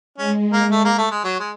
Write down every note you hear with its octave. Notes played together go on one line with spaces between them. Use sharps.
G#3 C#4
A#3
A3
A#3
A3
G#3
F#3
G#3